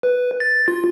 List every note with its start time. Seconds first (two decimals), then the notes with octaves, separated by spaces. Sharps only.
0.03 B4
0.40 A6
0.68 F4